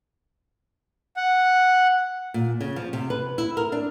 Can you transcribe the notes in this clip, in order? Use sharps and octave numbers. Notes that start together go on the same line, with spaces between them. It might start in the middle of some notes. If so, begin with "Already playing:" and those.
F#5
A#2
C#3
F3
C3
B4
E4
A#4
D4